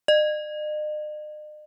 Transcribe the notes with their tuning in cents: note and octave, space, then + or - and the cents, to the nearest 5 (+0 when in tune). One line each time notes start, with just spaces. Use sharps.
D#5 -45